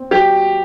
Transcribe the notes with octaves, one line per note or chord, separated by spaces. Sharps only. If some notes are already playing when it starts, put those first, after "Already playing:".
Already playing: C4
F#3 G4